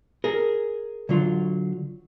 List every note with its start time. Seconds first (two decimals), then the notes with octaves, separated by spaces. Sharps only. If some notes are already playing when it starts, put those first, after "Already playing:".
0.24 G#4 A#4
1.09 D3 F#3 F4